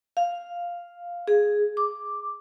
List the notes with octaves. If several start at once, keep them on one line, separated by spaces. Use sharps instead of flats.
F5
G#4
D6